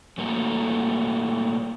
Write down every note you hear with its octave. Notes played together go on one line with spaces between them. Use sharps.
A#2 G3 A3 A#3 F#4 A4